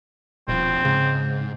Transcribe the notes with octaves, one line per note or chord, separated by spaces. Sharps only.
D#1 B2 F3 C4
G#2 C#3